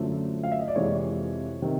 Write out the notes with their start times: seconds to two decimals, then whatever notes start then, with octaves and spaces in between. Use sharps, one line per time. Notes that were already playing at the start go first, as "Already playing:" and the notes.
Already playing: F#2 D3 F3 A3
0.43 F5
0.52 E5
0.60 D#5
0.68 D5
0.76 F2 C3 E3 G#3 C#5
1.62 C3 D#3